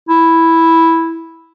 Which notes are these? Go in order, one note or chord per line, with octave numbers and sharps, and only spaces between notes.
E4